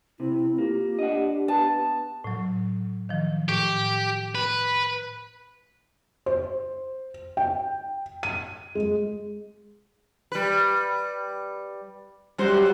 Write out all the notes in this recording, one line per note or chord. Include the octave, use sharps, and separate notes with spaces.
C3 C4 E4
A#3 F4 G4
D4 D#5 F#5
B3 A5
A2 F#3
D#3 F3
A2 G4
B4
C5
G5
D#7
G#3
G3 B4
F#2 G3 F#4 C5